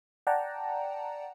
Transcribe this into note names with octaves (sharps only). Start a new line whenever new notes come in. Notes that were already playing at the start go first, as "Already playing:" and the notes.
D5 F#5 G5 A5 A#5